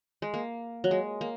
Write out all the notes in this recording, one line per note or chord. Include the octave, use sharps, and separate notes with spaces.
G#3
A#3
F#3
G#3
A#3